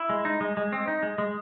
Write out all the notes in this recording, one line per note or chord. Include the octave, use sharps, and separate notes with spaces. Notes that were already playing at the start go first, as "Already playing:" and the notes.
Already playing: E4
G#3
D#4
G#3
G#3
C4
D#4
G#3
G#3